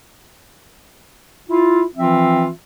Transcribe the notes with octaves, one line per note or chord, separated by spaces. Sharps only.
E4 F4
E3 F3 C4 F4 E5